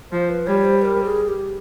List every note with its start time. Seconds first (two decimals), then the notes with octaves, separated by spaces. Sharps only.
0.12 F3 C5
0.29 B4
0.47 G3 C#5
0.64 C5
0.82 B4
0.85 A#4
1.04 G#4
1.28 G4